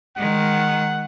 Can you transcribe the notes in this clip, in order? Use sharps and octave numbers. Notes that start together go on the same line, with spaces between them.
D#3 G#3 F#5